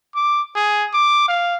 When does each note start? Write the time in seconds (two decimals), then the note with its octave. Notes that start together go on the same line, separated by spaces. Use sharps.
0.15 D6
0.55 G#4
0.93 D6
1.28 F5